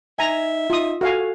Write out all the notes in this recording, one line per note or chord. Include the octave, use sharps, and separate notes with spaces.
D#4 E5 G#5 A#5
D#4 F4 D#6
F#4 A4 F5 G#5